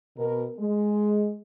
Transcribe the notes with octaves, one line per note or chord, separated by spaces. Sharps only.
B2 A#4
G#3